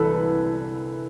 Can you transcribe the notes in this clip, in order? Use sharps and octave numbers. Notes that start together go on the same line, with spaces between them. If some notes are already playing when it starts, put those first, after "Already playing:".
Already playing: C2 E3 A4 B4